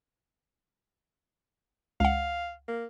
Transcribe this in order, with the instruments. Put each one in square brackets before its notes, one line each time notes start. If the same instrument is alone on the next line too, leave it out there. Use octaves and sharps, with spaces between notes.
[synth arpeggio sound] C#2 F#5 [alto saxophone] F5
[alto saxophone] A#3